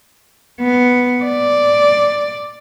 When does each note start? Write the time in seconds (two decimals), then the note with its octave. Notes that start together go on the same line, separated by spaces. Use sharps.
0.61 B3
1.24 D5